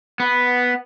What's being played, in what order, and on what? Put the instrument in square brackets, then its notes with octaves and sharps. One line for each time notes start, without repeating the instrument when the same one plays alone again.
[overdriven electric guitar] B3